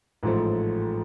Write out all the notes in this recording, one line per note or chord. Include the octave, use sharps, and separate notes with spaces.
A1 G#2 F3 A3